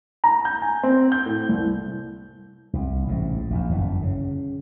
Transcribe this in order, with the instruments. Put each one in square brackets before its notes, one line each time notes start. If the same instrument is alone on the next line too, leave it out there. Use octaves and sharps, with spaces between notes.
[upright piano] A#5
G6
G#5
C4
G6
A2
C2
[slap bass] C2
A1 G#2
A#1 E2
G1 F#2 E3
C#3